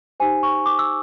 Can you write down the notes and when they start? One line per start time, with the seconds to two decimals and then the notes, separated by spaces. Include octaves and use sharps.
0.20 D#4 G4 C5 G#5
0.43 C#6
0.66 D6
0.79 E6